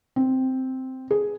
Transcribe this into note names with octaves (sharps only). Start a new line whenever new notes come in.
C4
G#4